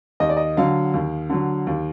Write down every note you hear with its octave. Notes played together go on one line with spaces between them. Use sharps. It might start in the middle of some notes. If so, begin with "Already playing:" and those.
D#2 D#5
D5
D#5
D3 F#3 F5
D#2
D3 F#3
D#2